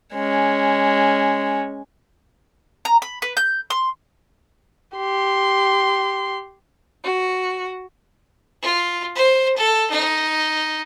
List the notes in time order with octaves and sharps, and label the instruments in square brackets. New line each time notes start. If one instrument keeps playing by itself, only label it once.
[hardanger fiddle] G#3 C#4
[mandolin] A#5
B5
B4
G6
C6
[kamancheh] G4 C6
[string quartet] F#4
[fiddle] F4
C5
A4
D#4